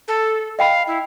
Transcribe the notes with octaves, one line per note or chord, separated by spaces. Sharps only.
A4
D#5 F5 G5 B5
E4